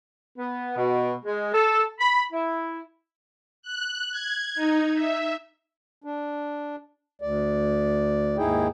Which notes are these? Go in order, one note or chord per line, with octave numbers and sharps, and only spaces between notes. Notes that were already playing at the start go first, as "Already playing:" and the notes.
B3
B2
G#3
A4
B5
E4
F#6
G#6
D#4
E5
D4
D2 D5
D#2 G#2 D#4 E4 G#4 G5